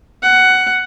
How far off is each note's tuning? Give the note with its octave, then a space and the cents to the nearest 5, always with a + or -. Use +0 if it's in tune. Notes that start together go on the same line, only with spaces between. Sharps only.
F#5 +10